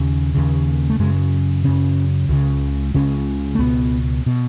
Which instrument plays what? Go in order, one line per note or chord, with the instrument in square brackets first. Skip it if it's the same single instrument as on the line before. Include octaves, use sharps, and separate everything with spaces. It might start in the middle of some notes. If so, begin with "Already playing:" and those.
Already playing: [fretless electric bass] D#2 C#3
D#2 C#3
A3
F#2 C#3 G#3
F#2 C#3 C#4
C#2 C#3
C#2 C#3 C#4
A3
C#2 B2 B3
B2